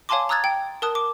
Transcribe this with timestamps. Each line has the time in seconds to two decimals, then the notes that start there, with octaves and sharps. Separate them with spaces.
0.09 C#5 F5 G#5 A5 C6 D6
0.29 A#5 D#6 E6 F#6 G#6 A6
0.44 G5
0.82 A#4 A5 D#6 F#6
0.95 D6